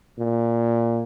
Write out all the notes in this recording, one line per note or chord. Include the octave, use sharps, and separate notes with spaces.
A#2